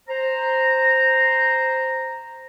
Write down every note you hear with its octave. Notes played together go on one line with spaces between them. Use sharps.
C5 A#5